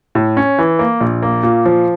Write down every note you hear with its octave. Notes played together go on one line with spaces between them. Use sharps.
A2
C#4
E3
A#3
A#1
A#3
A#2
F3